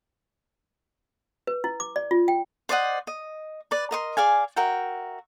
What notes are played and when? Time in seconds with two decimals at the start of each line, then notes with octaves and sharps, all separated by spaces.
1.47 B4
1.64 E4
1.80 D6
1.96 D5
2.11 F4
2.28 G5
2.69 C5 D5 D#5 F#5
3.07 D#5
3.71 B4 D5
3.91 A#4 D#5 C6
4.17 G#4 D5 F5 G#5
4.56 F#4 A#4 E5 G5